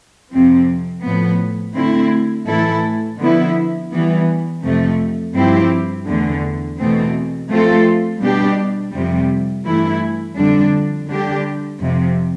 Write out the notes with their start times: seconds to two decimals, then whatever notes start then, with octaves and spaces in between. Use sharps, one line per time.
0.32 F2 C3 F3 C4
1.04 A2 F3 B3
1.76 D3 A3 C4 E4
2.47 A2 E3 A3 E4 A4
3.19 D3 F3 B3 E4
3.91 E3 G3 B3
4.63 F2 C3 F3 A3
5.35 G2 F3 C4 E4 G4
6.06 E2 D3 A3
6.78 E2 B2 A3 C4
7.50 F3 A3 C4 F4 A4
8.22 B2 G3 D4 G4
8.93 F2 C3 G3
9.66 G2 E3 A3 E4
10.36 F2 D3 G3 D4
11.08 D3 G3 D4 G4
11.80 F2 C3 F3